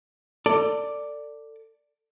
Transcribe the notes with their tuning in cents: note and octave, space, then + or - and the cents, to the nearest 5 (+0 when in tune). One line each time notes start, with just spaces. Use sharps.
A4 +30 D5 +0